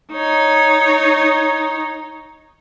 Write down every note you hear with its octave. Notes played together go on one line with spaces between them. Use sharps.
D#4 C#5